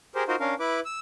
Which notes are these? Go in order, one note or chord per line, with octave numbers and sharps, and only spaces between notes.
G4 G#4 A#4 C5
D#4 F4 F#4 A#4 C5
C#4 D4 A#4 F5
E4 B4 D6
E6